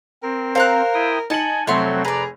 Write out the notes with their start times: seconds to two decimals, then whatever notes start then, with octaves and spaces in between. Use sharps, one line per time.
0.23 C4 A#4
0.55 A#4 C5 F5 A#5 F#6
0.94 E4 G5 D#6
1.30 D#4 G#5 A5 C#7 F#7
1.67 F1 F#3 A3 C4 A4 C#5 F#5 C6
2.05 G#4 B4 D5 A#5